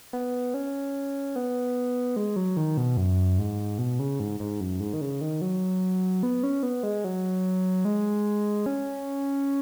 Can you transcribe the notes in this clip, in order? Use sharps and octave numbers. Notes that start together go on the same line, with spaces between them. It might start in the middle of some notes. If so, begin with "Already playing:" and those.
B3
C#4
B3
G#3
F#3
D#3
B2
F#2
G#2
B2
C#3
G#2
G#2
F#2
G#2
D#3
C#3
D#3
F#3
B3
C#4
B3
G#3
F#3
G#3
C#4